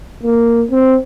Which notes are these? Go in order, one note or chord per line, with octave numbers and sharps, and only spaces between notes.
A#3
C4